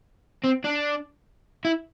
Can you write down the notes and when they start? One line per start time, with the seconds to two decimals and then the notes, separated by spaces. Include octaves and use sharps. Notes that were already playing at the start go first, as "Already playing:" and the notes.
0.44 C4
0.65 D4
1.65 E4